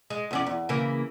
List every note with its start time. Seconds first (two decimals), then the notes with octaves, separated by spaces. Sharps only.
0.10 G#3
0.31 E2 C#4 D5
0.47 E2
0.69 C#3 E3 A#3